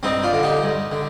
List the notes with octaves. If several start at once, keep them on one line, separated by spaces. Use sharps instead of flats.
G2 C4 D#4
D4 F4
D3
D#4 G4
G2
D3